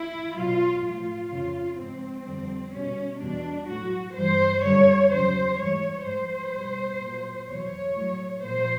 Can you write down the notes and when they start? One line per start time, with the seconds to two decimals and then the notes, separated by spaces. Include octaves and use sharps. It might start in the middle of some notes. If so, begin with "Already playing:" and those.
Already playing: E4
0.34 B2 F#3 F4
0.82 A2 F3 F4
1.30 F2 C#3 F3
1.78 G#2 F3 C4
2.25 F2 D3 G3
2.73 B2 G3 C#4
3.20 E2 B2 G3 D4
3.68 A2 F#3 F#4
4.15 G2 E3 G3 C5
4.63 F#2 D3 G3 C#5
5.11 E2 C#3 F#3 C5
5.58 G#2 E3 G3 C#5
6.05 G#2 F3 C5
6.53 B2 G3
7.00 A#2 F#3
7.48 E2 B2 F#3 C#5
7.95 A2 F#3
8.43 A#2 F3 C5